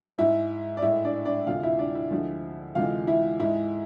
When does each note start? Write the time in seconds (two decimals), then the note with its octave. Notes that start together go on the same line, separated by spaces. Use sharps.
0.18 G#2 G#3 E4 E5
0.77 D5
0.82 A2 G#3 E4 E5
1.04 D4 D5
1.25 D4 D5
1.47 D2 C3 G#3 F4 F5
1.63 E4 E5
1.79 D4 D5
1.95 E4 E5
2.11 D2 D3 F3 G#3
2.75 D2 C3 E3 G#3 F4 F5
3.07 E4 E5
3.40 G#2 G#3 E4 E5